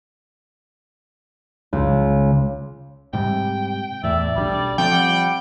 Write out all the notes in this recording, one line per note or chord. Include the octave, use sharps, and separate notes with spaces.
C#2
G#2 C3 G3 G5
E2 A2 D5 E5
B1 F3 G3 D4
F3 A3 C4 G5
G3 F#5